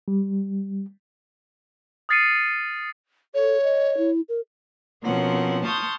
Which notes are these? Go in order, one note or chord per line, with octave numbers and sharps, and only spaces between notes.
G3
D#6 F6 A6 C7 C#7 D#7
A4 C#5
D#5
E4
A#4
B2 F3 C4 C#4 A#4 F#5
A5 C6 C#6 D#6 F6 G6